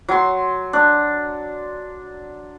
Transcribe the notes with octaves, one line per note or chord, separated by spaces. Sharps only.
F#3 C6
D4